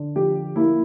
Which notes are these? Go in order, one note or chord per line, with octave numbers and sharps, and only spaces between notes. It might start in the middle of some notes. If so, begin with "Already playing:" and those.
Already playing: D3
F3 G4
A#3 E4